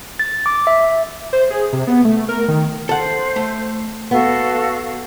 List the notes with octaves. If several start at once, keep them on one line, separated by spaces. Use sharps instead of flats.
A6
D6
E5
C5
G#4
C3
B3
A3
A#4
D#3
A4 C5 F#5
A3
B3 F#4 A4 F5